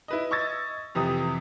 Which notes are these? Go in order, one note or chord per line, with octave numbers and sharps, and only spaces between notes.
E4 B4 D#5
D#5 C#6 E6 G#6 A6
F2 C3 E3 G4 D#6